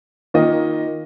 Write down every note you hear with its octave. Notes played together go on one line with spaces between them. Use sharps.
D#3 A#3 F4 D#5